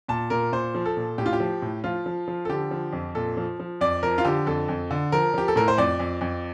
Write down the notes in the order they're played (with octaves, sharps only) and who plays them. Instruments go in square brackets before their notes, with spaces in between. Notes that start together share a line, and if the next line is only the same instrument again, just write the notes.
[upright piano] A#2 A5
A#2 A#4
A#2 C5
F3
A4
A#2
A2 G4
F4
G4
F3
A2
F3 F4
F3
F3
A4
D3 G4
F3
F2
A#2 A4
F3
F3
F2 D5
F3 A#4
F4
D3 G4
F2 A4
F2
D3
F3 A#4
F3 G4
A4
A2 A#4
C5
F2 D5
F2
F2